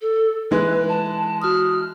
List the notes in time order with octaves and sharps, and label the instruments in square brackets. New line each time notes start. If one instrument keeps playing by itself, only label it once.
[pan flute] A4
[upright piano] E3 G#3 [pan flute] B4
[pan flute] A5
[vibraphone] F#4 D#6 [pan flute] F6